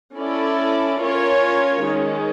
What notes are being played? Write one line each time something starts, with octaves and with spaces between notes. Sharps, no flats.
C#4 E4 A4 D5
C#4 F4 A#4 C#5
D#3 G#3 C#4